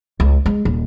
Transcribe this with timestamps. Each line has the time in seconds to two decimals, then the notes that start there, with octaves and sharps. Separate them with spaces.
0.20 C#2
0.46 G#3
0.65 D#1